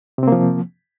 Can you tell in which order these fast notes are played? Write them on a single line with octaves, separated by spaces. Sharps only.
C3 C4 A#3 F3